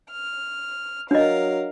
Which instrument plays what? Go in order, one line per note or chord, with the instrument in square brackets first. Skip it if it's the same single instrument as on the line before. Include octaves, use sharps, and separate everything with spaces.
[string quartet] F6
[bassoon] F#3 [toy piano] D4 D#5 [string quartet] A#4 F5